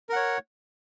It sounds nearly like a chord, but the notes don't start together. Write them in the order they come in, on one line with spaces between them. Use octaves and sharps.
A#4 F#5 C#5